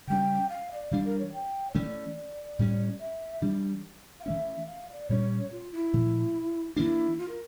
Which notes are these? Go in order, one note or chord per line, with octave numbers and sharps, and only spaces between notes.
C#3 G3 C#4 G5
F5
D5
E3 G3 D4 F5
A#4
C#5
G5
C#5
E3 A3 C#4 D5
A2 G3 C#4
E5
E3 G3 D4
F5
E3 A3 C#4 E5
F5
D5
A#2 G3 A#3 C#4 C#5
F4
E4
A#2 F3 A3
E3 A#3 D4 E4
F4
A#4